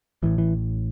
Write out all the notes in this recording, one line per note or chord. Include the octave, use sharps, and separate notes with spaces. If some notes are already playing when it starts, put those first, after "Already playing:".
A1 A2 E3
E3